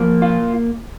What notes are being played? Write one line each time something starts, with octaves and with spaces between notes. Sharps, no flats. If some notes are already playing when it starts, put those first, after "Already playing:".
Already playing: F3 A#3
F4